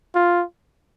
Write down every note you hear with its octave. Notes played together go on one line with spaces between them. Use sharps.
F4